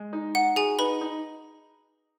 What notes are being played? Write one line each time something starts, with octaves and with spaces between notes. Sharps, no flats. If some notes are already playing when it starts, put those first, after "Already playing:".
Already playing: G#3
D#4
D#4 F#5
F#4 G#4 G#5
D#4 B4 B5
D#4